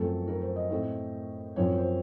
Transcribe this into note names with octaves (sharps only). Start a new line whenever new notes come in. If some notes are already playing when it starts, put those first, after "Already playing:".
Already playing: F#2 F3 A3 C4 A4
A#4
C5
D#5
A2 A3 C4
F#2 F3 C4 C#5
C5